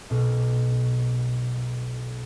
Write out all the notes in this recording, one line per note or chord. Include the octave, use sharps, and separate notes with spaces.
B1 B2